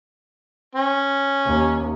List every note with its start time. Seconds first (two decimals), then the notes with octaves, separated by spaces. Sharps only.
0.75 C#4
1.46 D#2